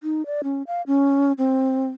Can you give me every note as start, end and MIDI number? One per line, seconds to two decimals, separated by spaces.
0.03 0.26 63
0.26 0.41 74
0.43 0.63 61
0.67 0.82 77
0.87 1.32 61
1.38 1.88 60